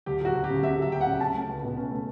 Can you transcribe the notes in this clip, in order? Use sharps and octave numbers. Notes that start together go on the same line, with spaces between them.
D2 G4
F#3 F#4
D2
G4
C#3
D2 E5
F#3 E5
D2 G5
F#5
C#3
C#4 A5
A3
C#2
B2
C#4
A3